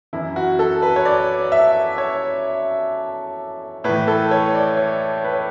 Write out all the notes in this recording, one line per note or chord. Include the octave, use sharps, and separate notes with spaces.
F#2 E3 E4
F#4
A4
B4
C#5
D5
E5
C#5
A2 E3 B4
A4
C#5
D5
C#5
B4
C#5